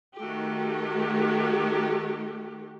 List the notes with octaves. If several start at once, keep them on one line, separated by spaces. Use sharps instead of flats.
D#3 A3 F#4 G4